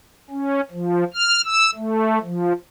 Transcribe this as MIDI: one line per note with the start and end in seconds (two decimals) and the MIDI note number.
0.30 0.61 61
0.71 1.04 53
1.14 1.41 89
1.45 1.70 88
1.75 2.18 57
2.22 2.53 53